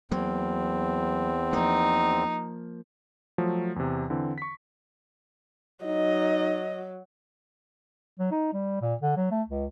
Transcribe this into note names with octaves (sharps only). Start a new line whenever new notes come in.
E2 F#3 A#3 C4
F3 A#3 D#4
F3 F#3 A3
E2 C3
D3 E3 C4
C#6 B6
F#3 D#4 D#5
F#3
D#4
G3
A#2
D3
F#3
A3
C#2